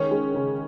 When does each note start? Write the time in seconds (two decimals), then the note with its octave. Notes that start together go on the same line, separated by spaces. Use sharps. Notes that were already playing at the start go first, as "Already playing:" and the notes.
Already playing: D#3 G#3 C#4
0.11 G#3
0.34 C#3